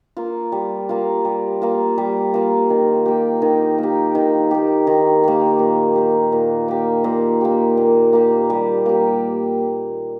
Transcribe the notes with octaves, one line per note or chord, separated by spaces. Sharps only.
A#3 F4
G3
A#3 F4
G3
A#3 F4
G3
A#3 F4
D#3
A#3 G4
D#3
A#3 G4
D#3
A#3 G4
D#3
A#3 G4
A#2
A#3 G4
A#2
A#3 G4
A#2
A#3 G4
A#2
A#3 G4
G3
A#3 G4